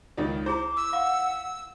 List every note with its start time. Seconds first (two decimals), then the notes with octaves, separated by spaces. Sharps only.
0.17 C#2 D#3 D5
0.46 E4 G#4 C5 A#5 D6
0.77 E6
0.93 F5 F#5 D6